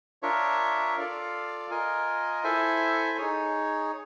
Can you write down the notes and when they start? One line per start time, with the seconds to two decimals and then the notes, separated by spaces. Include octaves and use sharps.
0.22 D4 F4 A#4 C#5 E5
0.97 F4 A4 D5 F5
1.70 F4 A#4 D#5 G#5
2.44 E4 A4 C5 E5 G#5
3.18 D#4 G#4 C#5